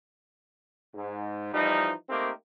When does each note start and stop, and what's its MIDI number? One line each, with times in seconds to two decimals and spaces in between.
0.94 1.53 44
1.53 1.91 52
1.53 1.91 53
1.53 1.91 55
1.53 1.91 63
2.10 2.30 57
2.10 2.30 58
2.10 2.30 60
2.10 2.30 63
2.10 2.30 67
2.10 2.30 70